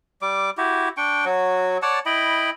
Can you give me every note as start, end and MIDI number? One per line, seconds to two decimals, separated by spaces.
0.22 0.50 55
0.22 0.50 86
0.57 0.89 64
0.57 0.89 66
0.57 0.89 67
0.97 1.25 62
0.97 1.25 79
0.97 1.25 85
1.25 1.77 54
1.25 1.77 66
1.82 1.99 73
1.82 1.99 74
1.82 1.99 78
1.82 1.99 81
2.06 2.50 64
2.06 2.50 75
2.06 2.50 79
2.06 2.50 83